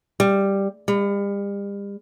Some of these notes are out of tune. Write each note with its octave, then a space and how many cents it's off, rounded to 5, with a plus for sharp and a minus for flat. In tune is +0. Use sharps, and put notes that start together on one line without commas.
G3 +5
G3 +40